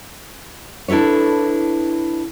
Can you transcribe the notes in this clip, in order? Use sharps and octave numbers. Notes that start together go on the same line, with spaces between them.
D4 E4 A4 B4 C#5